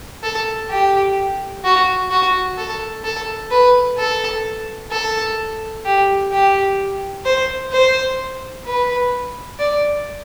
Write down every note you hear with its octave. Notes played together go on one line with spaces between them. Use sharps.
A4
G4
F#4
F#4
A4
A4
B4
A4
A4
G4
G4
C5
C5
B4
D5